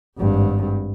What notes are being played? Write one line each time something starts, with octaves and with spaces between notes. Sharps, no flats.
G#1 G2